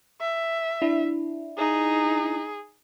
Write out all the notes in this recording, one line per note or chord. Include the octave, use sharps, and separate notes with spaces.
E5
D4 E4
D#4 G#4